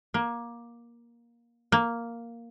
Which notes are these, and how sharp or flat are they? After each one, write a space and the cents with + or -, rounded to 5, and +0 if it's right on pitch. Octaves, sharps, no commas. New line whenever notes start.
A#3 +15
A#3 +0